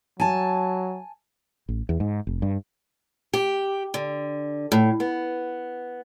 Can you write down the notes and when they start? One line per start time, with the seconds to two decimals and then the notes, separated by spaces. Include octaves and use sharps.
0.20 F#3 G#5 A5
1.68 A1
1.89 E2
2.00 G#2
2.27 F1
2.42 G2
3.33 G4
3.94 D3
4.72 A2
5.00 B3